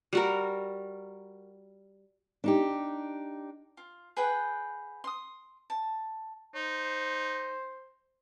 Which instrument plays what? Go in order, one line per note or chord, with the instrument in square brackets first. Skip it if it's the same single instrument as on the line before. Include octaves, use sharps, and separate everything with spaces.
[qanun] G3 F#4 A#4
[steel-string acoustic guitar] D4 D#4 G4
[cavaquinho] F4
G#4 B4 F#5 G5
C6 D#6
A5
[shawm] D#4 [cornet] C5